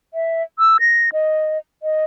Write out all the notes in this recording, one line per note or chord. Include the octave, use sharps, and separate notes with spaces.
E5
E6
A#6
D#5
D#5